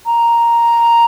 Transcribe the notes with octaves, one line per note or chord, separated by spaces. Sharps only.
A#5